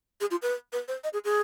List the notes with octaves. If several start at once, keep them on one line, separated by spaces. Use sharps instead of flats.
G#4
F4
B4
B4
C5
D#5
G#4
G#4